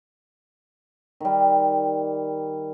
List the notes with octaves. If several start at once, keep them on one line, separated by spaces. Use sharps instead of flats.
D#3 G3